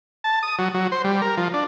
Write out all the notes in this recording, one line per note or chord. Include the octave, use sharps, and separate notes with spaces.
A5
D#6
F#3
F#3
C5
G3
A#4
F3
D4